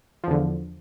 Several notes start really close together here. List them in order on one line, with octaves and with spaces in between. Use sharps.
F3 E2 D3